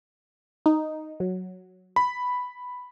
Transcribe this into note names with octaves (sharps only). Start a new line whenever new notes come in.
D#4
F#3
B5